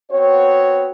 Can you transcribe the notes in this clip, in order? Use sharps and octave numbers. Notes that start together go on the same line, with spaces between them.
B3 C4 F#4 C#5